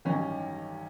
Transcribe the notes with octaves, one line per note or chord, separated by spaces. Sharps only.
A1 G2 D#3 F#3 C#4